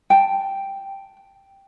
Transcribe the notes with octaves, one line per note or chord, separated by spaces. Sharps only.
G5 A5